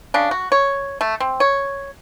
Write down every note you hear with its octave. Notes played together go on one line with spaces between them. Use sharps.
C#3 D4
F#4
C#5
A3
C4
C#5